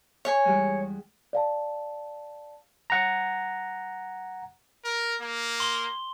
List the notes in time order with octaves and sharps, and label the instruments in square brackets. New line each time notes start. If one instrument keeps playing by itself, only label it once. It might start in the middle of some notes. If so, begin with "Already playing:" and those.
[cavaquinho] C#5 G#5
[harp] E2 G3 G#3
[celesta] D5 F5 A5
[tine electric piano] F#5 A#5
[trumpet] A#4
A#3
[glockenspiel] C6 G7